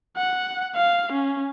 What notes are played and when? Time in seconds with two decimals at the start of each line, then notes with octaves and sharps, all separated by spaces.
0.17 F#5
0.76 F5
1.12 C#4